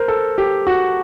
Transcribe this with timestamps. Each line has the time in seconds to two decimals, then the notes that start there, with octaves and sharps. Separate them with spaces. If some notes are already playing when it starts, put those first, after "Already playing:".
Already playing: A#4 C5
0.08 A4
0.38 G4
0.67 F#4